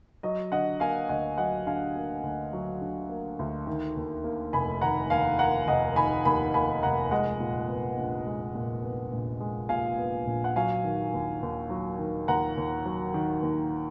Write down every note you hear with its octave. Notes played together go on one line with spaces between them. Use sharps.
F#3 D#5
D3 D#5 F#5
A#3 F5 G#5
D2 D#5 F#5
F#3 D#5 F#5
D3 F5 G#5
A#3
D2
F#3
D3
A#3
D2
D#3
D#2
A#3
F1 G#5 B5
D#3 F#5 A#5
D#2 F5 G#5
A#3 F#5 A#5
F1 D#5 F#5
D#3 G#5 B5
D#2 G#5 B5
A#3 G#5 B5
F1 F#5 A#5
G#3 D#5 F#5
A#2
B3
A#1
G#3
A#2
B3
A#1
G#3
A#2 F5 G#5
B3
A#1
F#5
F#3 F5 G#5
D#3
D#2
D#2
F#3
D#3
D#2 F#5 A#5
D#2
F#3
D#3
D#2